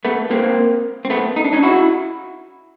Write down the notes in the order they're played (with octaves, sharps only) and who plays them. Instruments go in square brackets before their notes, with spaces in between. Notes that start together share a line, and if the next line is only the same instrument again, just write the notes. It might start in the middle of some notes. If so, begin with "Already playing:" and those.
[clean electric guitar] A3 B3
A#3 C4
C4
A3 B3
D#4
D4
C#4 D#4
E4 F#4